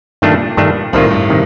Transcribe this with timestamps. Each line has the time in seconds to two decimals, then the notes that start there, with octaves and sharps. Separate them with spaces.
0.22 G2 A#2 D#3 A3 D4
0.57 G2 D#3 A3 D4
0.93 C2 A2 C3 D#3 A#3 F4
1.10 G2
1.30 C3 D#3